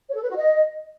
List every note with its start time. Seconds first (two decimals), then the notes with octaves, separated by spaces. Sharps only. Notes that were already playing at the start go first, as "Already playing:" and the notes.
0.08 C#5
0.15 A4
0.22 B4
0.29 F#4
0.36 D#5